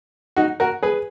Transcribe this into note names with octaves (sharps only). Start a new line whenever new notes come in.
D#4 F#4
F#4 A#4
G#4 B4